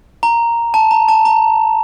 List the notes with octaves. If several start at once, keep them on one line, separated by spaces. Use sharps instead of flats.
A#5
A5
A#5
A5
A#5